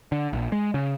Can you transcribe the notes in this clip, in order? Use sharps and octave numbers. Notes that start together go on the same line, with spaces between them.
D3
A#1
G#3
C#3